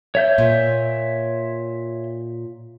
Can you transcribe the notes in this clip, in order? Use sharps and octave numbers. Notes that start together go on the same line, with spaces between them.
C#5 E5 G6
A#2